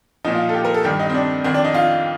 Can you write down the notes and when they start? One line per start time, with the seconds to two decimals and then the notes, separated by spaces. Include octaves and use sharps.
0.25 A#2 F3 D#4
0.34 F4
0.49 A4
0.54 G4
0.65 A#4
0.74 A4
0.84 G2 D#3 G4
0.99 D#4
1.10 C4
1.14 D4
1.44 F2 D#3 C4
1.54 D4
1.65 D#4
1.74 F4